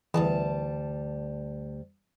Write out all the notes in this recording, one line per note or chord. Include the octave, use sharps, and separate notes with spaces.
D2 E3 G3 A5